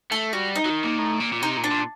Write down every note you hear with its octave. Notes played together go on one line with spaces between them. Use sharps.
A3 A4
G3 F#4
D#4
F#3
D#3
A#2
A2
A#2
A#2
C3 D#4
A#2
D4
A#2